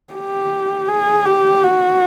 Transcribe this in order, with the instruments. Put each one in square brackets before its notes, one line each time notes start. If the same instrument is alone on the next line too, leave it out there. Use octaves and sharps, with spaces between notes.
[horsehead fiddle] G4
G#4
G4
F#4